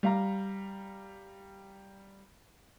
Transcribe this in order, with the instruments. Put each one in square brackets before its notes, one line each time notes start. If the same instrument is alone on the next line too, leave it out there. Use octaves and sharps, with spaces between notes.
[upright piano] G3 F5 A#5